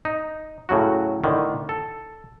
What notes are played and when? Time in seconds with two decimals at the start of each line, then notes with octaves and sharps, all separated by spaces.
0.05 D#4
0.69 A2 C#3 F#3 F#4
1.24 A2 D3 D#3
1.69 A4